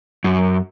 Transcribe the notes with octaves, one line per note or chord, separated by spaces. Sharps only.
F#2